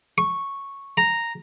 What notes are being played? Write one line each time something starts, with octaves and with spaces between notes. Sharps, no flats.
C#6
A#5